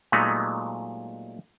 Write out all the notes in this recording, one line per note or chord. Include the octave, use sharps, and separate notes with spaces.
A#2 F#3 G#3 A3 B3 D#4